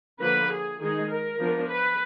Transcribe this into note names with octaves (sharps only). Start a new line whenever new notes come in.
D3 F3 A#3 B4
G#4
D#3 G#3 D#4 G#4
A#4
F3 B3 D4
B4